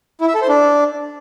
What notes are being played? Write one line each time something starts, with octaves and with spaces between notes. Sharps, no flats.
E4
E5
A4
C5
D4